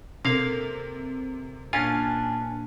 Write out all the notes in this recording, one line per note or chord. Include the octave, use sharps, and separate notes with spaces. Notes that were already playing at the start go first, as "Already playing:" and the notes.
C3 A#3 A4 A#4 F5 C6
A#2 A#3 C#4 D4 F4 G#5